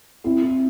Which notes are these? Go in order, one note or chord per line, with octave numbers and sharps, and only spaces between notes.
C4 E4